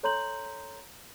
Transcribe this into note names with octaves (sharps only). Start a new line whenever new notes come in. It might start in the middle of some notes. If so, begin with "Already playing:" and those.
A4 C#5 A#5 C6 G6 F#7